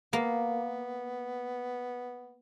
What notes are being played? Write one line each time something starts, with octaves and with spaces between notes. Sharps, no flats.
A#3 B3